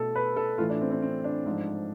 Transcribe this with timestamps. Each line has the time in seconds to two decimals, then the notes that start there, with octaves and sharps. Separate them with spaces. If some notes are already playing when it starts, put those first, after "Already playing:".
Already playing: B2 A3 A4
0.15 B4
0.36 A4
0.58 A2 E3 A3 F4
0.70 D4
0.81 C4
0.91 C4
1.02 C4
1.24 D4
1.46 G#2 F3 A3